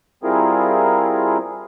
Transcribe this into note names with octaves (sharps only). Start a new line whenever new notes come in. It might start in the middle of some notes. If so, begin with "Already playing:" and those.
G3 C4 E4 F4 G#4 A#4